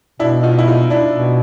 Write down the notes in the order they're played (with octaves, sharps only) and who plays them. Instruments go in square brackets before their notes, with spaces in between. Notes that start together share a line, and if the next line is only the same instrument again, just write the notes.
[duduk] B2 [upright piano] D4 E4
[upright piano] D#4 F4
E4
D#4 F4
D4 E4
[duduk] B2